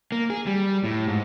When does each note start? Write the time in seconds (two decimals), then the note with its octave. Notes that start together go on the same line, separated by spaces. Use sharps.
0.12 A#3
0.30 G#4
0.46 G3
0.84 A2
1.08 G#2